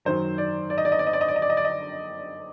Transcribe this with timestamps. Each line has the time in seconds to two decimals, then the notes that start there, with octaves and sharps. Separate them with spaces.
0.05 F#2 D#3 F#3 C5
0.38 D5
0.70 D5
0.78 D#5
0.85 D5
0.92 D#5
0.99 D5
1.07 D#5
1.13 D5
1.21 D#5
1.28 D5
1.36 D#5
1.42 D5
1.50 D#5
1.57 D5
1.65 D#5